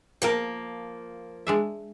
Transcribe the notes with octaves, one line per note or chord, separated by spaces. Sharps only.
F3 A#3 A#4 G5
G#3 D4 E5